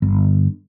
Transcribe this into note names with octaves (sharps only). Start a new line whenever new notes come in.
G1